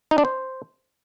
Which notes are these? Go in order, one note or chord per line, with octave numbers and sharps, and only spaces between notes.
D#4
D4
C5